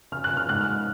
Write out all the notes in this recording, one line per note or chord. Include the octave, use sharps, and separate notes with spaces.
C#3 F6
F#6
C#3
F6
G#2 F#6
F6